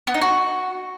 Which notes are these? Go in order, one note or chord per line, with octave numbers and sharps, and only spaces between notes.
B3
D#4
F#4